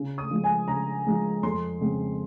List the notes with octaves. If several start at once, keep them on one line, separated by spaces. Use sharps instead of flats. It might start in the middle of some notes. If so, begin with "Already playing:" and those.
Already playing: C#3
D#6
F3 G#3
G#5
C#3 A#5
F3 G#3
F2 C6
C#3 G#3 C4